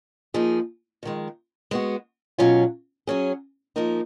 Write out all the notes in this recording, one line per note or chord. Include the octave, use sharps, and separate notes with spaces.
F3 A#3 D#4 G#4
F2 D#3 G#3
G#3 B3 F#4
B2 F#3 C#4 F4
F#3 C#4 G#4
F3 A#3 D#4 A#4